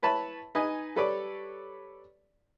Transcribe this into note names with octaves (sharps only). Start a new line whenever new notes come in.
E4 B4 C#5 A5 B5
D#4 B4 D#5 G#5
G3 A4 B4 C#5 D5